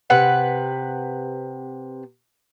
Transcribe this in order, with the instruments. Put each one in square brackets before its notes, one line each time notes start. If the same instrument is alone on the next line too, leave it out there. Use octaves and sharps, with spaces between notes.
[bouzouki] C3 B4 F#5